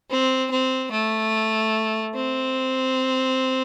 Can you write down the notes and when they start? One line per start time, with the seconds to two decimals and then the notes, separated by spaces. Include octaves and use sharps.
0.10 C4
0.51 C4
0.91 A3
2.15 C4